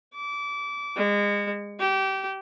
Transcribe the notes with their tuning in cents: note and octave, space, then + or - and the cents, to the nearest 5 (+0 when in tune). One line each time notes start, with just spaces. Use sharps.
D6 -25
G#3 -30
G4 -25